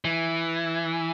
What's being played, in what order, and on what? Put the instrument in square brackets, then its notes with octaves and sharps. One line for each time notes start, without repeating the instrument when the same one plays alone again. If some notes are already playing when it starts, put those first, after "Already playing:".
[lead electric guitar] E3